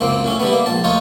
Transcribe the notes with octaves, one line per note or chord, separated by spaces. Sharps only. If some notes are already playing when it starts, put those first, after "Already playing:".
C#2 F#2 A#3 C4
A2 F#3 C#4
D3 G3 A3 B3
A#3
A#1 G#2 A5
D2 D#4 F4 C#5